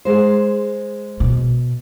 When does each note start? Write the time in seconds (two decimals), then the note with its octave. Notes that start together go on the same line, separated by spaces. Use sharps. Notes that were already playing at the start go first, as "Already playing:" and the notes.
0.05 G#3 C5
1.20 B2